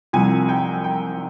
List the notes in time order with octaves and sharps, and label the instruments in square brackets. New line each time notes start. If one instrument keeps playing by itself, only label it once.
[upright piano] C2 C3 F3 G#5
G5
G5